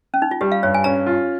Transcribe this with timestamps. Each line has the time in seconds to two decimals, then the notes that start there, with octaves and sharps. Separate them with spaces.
0.14 C#4
0.22 D#4
0.31 F4
0.41 G3 G4
0.52 F5
0.63 G2 C#5
0.74 G#5
0.84 C#4 A#5
1.06 F4